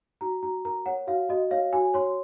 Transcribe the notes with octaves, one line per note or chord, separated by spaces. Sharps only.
F#4 A#5
F#4 A#5
A#4 A#5
C#5 F#5
F#4 F5
F#4 D#5
C#5 F5
F#4 G#5
C#5 C6